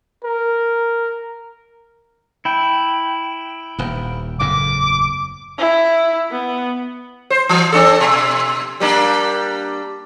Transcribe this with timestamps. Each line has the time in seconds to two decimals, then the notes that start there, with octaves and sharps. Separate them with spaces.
0.24 A#4
2.45 E4 G5
3.79 D#1 D#2
4.40 F#1 E2 A2 D6
5.58 E4
6.31 B3
7.30 C5
7.49 E3
7.73 C4 D4 A4
8.00 B2
8.80 G3 A#3 D4